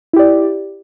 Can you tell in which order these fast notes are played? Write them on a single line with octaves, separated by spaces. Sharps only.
E4 G4 D5